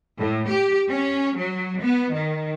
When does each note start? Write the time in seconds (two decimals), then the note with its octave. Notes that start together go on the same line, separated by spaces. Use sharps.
0.18 A2
0.49 G4
0.89 C#4
1.37 F#3
1.81 B3
2.13 D#3